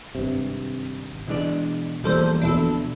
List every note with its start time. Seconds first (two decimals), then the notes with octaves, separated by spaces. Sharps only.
0.15 G#1 G2 C3
1.27 B2 E3 G#3 D4 D5
2.04 E1 E3 F3 G3 G#3 A#3 A4 C5
2.42 D2 B2 D4 E4 A4